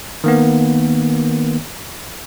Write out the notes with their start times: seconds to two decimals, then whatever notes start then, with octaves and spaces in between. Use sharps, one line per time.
0.24 D#3 A#3 B3